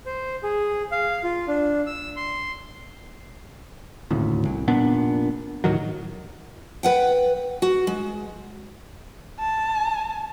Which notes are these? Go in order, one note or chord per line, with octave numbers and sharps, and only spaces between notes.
C5
G#4
F5
F4
D4
E6
C6
D#1 G#1 D2 A2
C2
F1 A#2 B3 D4
D2 A2 D#3 F#3
B4 F#5 G5
F#4
G#3
A5